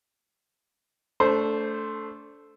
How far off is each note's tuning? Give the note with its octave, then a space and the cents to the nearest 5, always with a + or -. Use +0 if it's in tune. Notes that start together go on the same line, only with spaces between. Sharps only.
A3 +0 D4 -30 C5 +0